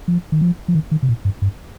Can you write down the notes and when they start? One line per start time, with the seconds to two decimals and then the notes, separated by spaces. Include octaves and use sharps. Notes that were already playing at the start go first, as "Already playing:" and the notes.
0.08 F3
0.32 D#3
0.41 F3
0.68 F3
0.75 D#3
0.91 D#3
1.03 C3
1.09 A#2
1.25 G2
1.42 G2